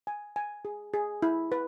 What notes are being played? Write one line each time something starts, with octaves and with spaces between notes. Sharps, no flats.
G#5
G#5
G#4
G#4
E4
B4